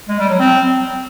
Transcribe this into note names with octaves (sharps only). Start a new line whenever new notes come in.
G#3
G3
F#3
C4